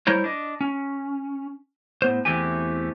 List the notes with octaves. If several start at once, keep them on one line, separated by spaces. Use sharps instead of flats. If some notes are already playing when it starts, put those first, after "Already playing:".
G3 E4 A#4 C5 C#5
D4 D#5
C#4
A2 B3 C5
E2 E3 A3 C4 G4 G#5